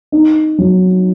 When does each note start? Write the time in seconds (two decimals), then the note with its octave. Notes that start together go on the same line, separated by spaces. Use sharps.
0.12 D#4
0.58 F#3